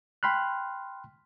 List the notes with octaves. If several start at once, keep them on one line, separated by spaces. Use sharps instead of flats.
G5 B5 C6 F6 F#6